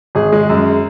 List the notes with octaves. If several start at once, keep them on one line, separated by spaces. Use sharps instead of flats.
G#1 G#4
G#3
F#2